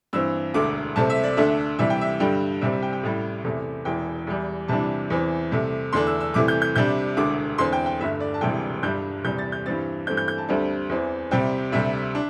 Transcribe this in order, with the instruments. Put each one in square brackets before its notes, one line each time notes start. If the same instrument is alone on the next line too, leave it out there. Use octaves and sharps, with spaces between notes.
[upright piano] G2 E3 C4 E6
E1 D2 D3 A3 D6
C2 C3 A3 C4 A5
E5
D5
D2 D3 A3 D4 E5
C2 C3 E3 G3 E5
G5
E5
G2 D3 G3 G5
C2 C3 G3 C4 E5
E5
G5
G5
A1 A2 G3
E2 C3 A3
E1 E2 E3 G5
E2 E3 G3
C2 C3 E3 G3 D4 A5
E2 E3 C4
C2 C3 A3
E2 D3 A3 D4 C6
E6
E6
C2 C3 E3 A3 D6
G6
G6
C2 C3 G3 D4 G6
E1 D2 D3 D6
E2 D3 C4 C6
G5
G5
G1 G2 D3 A3 E5
D5
A5
E1 D2 C3 E3 G3 G5
G1 G2 G3 D4 G6
E2 C3 G3 G6
A6
G6
G2 E3 G3 C4 A6
G2 E3 A3 C4 G6
G6
G6
A5
D2 D3 G3 C4
E2 E3 C4
C2 C3 G3 C4 G5
D2 C3 G3 E5
D4